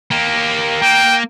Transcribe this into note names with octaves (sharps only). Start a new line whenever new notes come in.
A#3 G4
A#3 G5